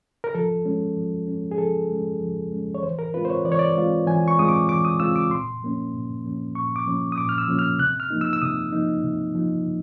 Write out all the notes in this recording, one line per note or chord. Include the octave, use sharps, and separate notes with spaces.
A#4
F3 A4
G#3 C#4
F3
G#3 C#4
G#4
F3 A4
G#3 C#4
F3
G#3 C#4
C#5
E3 C5
A#4
G#3 C4 F4 B4
C5
C#5
E3 D5
C#5
D5
G#3 C4 F4
E3 G#5
C#6
G#3 C4 F4 D#6
D6
E3 D6
D#6
G#3 C4 F4 E6
D6
A#2 C6
F3 A#3 C#4
A#2
F3 A#3 C#4
A#2 C#6
D6
F3 A#3 C#4
D#6
A#2 D6
F6
E6
F3 A#3 C#4
F6
C3 F#6
F6
F3 A#3 D#4
E6
E6
C3 D#6
F3 A#3 D#4
C3
F3 A#3 D#4
C3